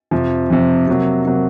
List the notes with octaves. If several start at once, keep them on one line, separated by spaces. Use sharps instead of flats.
F2 C3 F3
F2 C3 F3
C3 F#3 A#3
C3 F#3 A#3